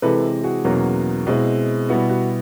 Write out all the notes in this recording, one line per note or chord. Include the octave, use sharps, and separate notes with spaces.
C3 E3 G#3 A4 B4
F#4 G#4
E2 B2 F#3 A#3 C#4
B2 G#3 C4 E4
B2 G3 B3 E4 F#4
F#4